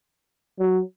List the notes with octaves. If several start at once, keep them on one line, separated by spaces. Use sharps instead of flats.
F#3